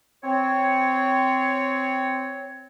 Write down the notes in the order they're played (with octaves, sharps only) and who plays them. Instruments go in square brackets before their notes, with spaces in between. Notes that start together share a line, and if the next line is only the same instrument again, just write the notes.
[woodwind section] C4 C#5